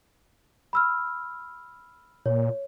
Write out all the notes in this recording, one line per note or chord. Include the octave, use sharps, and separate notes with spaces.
B5 E6 F6
A#2 C#5